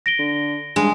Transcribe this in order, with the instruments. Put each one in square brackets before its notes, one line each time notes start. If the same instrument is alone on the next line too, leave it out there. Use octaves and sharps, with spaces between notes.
[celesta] A#6 D7 G7
[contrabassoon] D3
[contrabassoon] G2 [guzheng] G#3